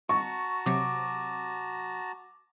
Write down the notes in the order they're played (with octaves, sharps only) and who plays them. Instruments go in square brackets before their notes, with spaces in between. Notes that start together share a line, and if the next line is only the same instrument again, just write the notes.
[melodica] F#4 A5 A#5 [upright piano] C#6
[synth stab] C3 F#3 [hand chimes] D6